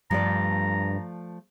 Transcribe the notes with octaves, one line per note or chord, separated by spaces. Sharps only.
G2 F3 A3 D5 A#5